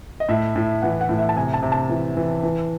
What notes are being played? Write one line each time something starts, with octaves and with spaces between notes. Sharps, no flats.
D#5
A2 E5
A2
E3 F#5
F#5
A2
E5
A5
C3 G#5
A5
C3
A5
E3
E3
E3